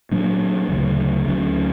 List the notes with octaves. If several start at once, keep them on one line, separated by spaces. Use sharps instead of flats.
A#2 F#3 A#3 D4
D2 C#3 F#3
D2 D3 F#3 C#4